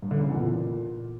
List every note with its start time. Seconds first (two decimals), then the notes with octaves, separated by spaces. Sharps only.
0.02 G2
0.11 D3
0.20 C#3
0.28 E2
0.37 A#2